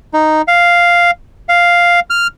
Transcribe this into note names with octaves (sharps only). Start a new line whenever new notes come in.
D#4
F5
F5
F6